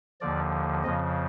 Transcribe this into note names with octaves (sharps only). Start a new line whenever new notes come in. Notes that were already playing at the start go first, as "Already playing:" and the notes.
D#2 D3 F3 D5
F2 C#3 F3 D#5